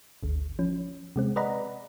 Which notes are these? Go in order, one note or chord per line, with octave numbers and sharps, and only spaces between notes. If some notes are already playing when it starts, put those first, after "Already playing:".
G1 D2
F3 C#4
C3 G#3 C4
B4 D5 D#5 F#5 A#5 B5